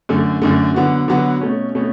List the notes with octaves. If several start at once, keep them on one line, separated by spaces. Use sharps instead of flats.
F#2 D3 A3
F#2 D3 A3
D3 F#3 B3 F#4
D3 F#3 B3 F#4
B2 A3 C#4
B2 A3 C#4